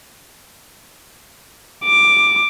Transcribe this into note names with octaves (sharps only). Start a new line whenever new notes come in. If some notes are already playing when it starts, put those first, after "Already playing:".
D6